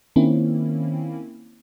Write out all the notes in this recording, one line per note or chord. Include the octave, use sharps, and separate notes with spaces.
D#3 A#3 C4 C#4 E4